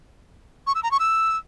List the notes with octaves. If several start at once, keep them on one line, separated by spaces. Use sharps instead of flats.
C#6
E6
A#5
C#6
E6